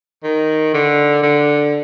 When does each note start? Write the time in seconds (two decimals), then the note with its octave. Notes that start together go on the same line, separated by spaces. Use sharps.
0.24 D#3
0.74 D3
1.23 D3